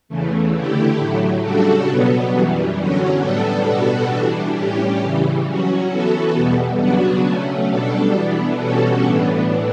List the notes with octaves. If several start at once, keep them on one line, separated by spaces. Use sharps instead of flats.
E2 C#3 E3 A3
D3 A3 E4 G4
A2 F#3 A3
C#3 G3 D4 F#4 A4
B2 F#3 B3
F#2 E3 G3
E2 D3 F#3 C#4 F#4
A2 G3 B3 D4 A4
B2 G3 B3 F#4 A4
E3 G3 D4
A2 G3 C#4 G4
C#3 E3 G3
F#3 C#4 F#4
E3 B3 F#4 A4
E2 B2 G3
C#3 F#3 B3 D4 F#4
F#3 A3 C#4
B2 G3 D4 A4
E3 B3 D4
B2 G3 C#4 F#4 A4
A2 E3 B3 D4